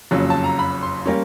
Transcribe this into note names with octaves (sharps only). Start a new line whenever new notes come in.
F#1 F2 C#3 F#3
A5
A#5
B5
C6
G3 A#3 C#4